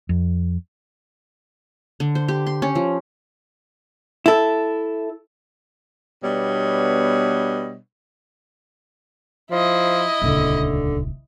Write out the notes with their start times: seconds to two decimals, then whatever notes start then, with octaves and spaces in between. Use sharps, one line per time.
0.09 F2
2.00 D3
2.15 C5
2.28 G4
2.47 C6
2.62 C#4
2.75 F3
4.26 E4 A4
6.23 B2 G3 B3 D4 C#5 D#5
9.51 F3 E4 D#5
10.22 D#1 C#2 D3